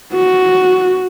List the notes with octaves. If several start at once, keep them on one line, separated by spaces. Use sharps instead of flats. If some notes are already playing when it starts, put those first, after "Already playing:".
F#4